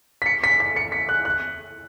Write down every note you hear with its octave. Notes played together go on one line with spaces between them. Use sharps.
B6
C#7
B6
B6
C#7
B6
F#6
F#6